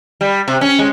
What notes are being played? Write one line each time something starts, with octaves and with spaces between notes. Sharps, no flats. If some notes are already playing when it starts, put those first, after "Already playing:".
G3
C3
C#4
G#3